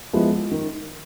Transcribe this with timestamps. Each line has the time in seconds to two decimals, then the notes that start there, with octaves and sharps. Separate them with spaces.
0.13 F3 G#3 B3 E4
0.51 D#3